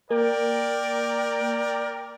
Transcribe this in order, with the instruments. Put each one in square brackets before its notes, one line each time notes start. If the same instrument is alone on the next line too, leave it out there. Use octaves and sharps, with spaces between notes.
[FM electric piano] A#3 [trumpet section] A#4 D5 G5